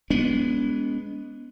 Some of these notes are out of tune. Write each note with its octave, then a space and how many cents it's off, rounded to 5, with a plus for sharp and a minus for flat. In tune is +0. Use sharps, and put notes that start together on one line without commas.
G#3 +0 B3 +0 D4 -45